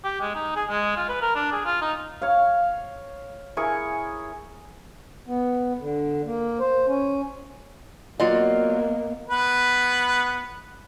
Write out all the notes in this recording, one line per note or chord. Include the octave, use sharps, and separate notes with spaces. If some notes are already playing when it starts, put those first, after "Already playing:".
G4
G#3
D#4
G#4
G#3
F4
B4
A#4
D4
G#4
F4
D#4
C#5 F5
E4 G#4 A#4 C#6
B3
D3
A#3
C5
C#4
F#3 A#3 B3 F4 D5 D#5
B3 B4